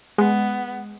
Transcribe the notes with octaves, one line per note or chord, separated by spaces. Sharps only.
G#3 B3